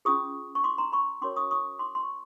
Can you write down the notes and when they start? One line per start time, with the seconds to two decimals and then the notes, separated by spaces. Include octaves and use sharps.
0.05 C#4 F4 G#4 C#6 D#6
0.55 C#6
0.64 C6 D6
0.78 A#5 C6
0.92 B5 C#6
1.21 C#4 F#4 A#4 C#5 C6 D6
1.36 C#6 D#6
1.51 C#6 D#6
1.79 C6 D6
1.95 C6
2.03 C#6